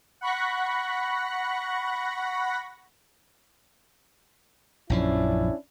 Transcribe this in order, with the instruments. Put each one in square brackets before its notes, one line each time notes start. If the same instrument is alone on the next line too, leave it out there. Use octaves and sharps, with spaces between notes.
[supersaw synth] F#5 B5 C#6 F#6 A#6
[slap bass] A#1 F#2 F3 [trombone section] C#4 D4 E4